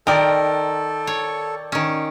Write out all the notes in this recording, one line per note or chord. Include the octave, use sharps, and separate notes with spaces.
D#3 A4 A#4 D5 G5
C#5
D#3 C#4